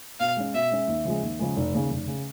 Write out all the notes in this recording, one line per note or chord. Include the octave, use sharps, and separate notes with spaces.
B2 F5
G#3 C#4
B2 E5
G#3 C#4
D#2
C#3 F3 G#3
D#2
C#3 F3 G#3
F1
D#2 C#3
F1
C#3